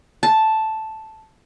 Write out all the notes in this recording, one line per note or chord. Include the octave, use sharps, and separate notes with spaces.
A5